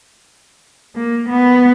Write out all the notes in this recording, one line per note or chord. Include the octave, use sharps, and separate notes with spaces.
A#3
B3